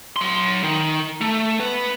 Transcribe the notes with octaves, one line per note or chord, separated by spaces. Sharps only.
F#3 C6
D#3
A3
B3 B4